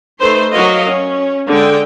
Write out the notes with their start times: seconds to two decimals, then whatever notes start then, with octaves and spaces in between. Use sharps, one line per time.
0.19 A3 D#4 B4 C5 C6
0.51 F#3 F#4 A#4 D#5 F5
0.91 C#4
1.48 D3 G#3 G5